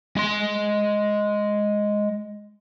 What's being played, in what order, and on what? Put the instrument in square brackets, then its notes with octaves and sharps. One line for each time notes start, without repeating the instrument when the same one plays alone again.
[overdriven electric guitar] G#3 C6